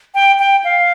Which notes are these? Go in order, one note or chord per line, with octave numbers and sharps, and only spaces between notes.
G5
G5
F5